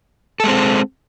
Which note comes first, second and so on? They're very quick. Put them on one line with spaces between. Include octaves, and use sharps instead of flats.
A4 G#3 C4